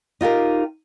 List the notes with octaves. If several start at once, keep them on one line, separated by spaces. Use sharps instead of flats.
D#4 F4 G4 A#4